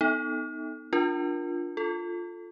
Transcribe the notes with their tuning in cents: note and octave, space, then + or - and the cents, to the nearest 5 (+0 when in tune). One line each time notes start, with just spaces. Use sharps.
B3 +20 D#4 +0 A4 +0
D4 +0 F4 +0 A#4 +20
F4 +0 A4 +0